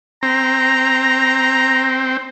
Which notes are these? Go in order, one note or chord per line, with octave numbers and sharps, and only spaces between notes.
C4 A#5